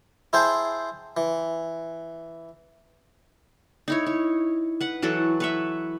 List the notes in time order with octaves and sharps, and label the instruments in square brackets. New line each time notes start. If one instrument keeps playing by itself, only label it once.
[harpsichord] E4 G#4 C5 G5 A5
E3
[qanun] D#4 E4 C#5
C#5
B4 F#5
E3 F#3 F#4 A4
B4 C#5 E5